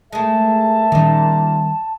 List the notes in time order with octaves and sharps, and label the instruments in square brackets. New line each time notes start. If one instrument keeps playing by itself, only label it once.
[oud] G#3 A3 [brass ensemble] G#4 A#4 E5 [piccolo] A5
[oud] A#2 D#4 [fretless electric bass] D#3 G3 C#4